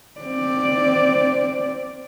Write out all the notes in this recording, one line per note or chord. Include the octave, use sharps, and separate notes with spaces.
C4 D5